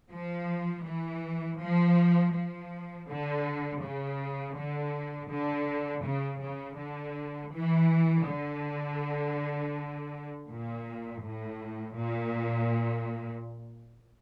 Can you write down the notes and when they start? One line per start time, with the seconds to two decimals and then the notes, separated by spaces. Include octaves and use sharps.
0.11 F3
0.84 E3
1.59 F3
2.33 F3
3.07 D3
3.82 C#3
4.56 D3
5.29 D3
6.04 C#3
6.42 C#3
6.78 D3
7.52 E3
8.26 D3
10.49 A#2
11.23 A2
11.97 A#2